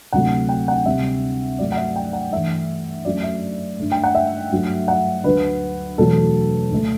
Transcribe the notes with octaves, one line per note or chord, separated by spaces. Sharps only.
D2 C3 F#3 A3 F#5
G5
F#5
D2 C3 G3 E5
G2 F#3 A3 D5
F#5
E5
G5
F#5
G2 E3 A3 E5
F#2 F#3 A3 D5
E5
G2 D3 A3
G5
F#5
E5
G2 F#3 A3
F#5
D2 D3 F#3 B4
E2 B2 F#3 A3 A4
D2 D3 A3